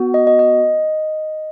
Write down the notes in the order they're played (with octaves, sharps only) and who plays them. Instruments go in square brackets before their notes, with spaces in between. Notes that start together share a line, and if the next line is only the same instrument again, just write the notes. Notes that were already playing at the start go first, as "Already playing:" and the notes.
Already playing: [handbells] B3 F#4
D#5
D#5
D#5